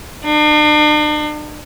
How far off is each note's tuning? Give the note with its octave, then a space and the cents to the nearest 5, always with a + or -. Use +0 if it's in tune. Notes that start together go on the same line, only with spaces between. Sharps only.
D4 +45